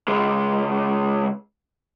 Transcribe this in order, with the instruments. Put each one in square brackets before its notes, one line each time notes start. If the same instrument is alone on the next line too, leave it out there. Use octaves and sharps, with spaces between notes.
[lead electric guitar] C#2 G#3